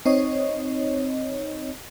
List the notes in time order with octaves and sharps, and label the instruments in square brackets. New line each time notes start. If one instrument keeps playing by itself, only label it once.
[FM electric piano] C4 D#4 C#5 D#5